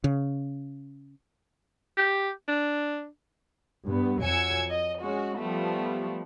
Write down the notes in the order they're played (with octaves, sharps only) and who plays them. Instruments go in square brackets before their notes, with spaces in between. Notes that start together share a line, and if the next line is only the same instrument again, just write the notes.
[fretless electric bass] C#3
[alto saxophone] G4
D4
[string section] G2 B3
F2 F#3 G#5 E6 G#6 C#7
D#5
G#3 C#4 F#4
F3 G3 A3 B3